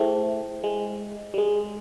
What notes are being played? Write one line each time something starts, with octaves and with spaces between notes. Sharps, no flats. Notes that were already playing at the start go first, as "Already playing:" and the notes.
Already playing: A3 E4 G#4 C5 E5 G5
G#3
G3
G#3